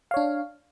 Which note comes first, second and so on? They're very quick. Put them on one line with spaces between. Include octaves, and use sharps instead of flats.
F5 C#5 D4